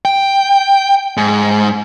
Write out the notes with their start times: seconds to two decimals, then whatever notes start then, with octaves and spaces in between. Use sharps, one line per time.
0.05 G5
1.17 G#2